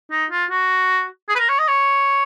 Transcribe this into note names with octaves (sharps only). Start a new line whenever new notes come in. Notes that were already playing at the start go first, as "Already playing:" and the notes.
D#4
F4
F#4
G#4
B4
A#4
C#5
D#5
C#5